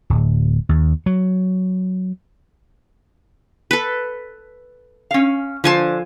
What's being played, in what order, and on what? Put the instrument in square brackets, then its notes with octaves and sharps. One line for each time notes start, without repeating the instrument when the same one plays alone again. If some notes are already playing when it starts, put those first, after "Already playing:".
[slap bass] D1
D#2
F#3
[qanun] A4 B4
[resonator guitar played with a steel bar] C#4 F5
[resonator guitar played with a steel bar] D3 C5 [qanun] F3 G#5 A5